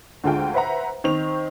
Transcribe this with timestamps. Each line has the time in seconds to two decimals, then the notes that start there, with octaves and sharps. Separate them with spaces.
0.24 D2 D3 G#3 F4 G5
0.54 B4 C5 E5 F#5 A#5
1.04 D#3 C4 F7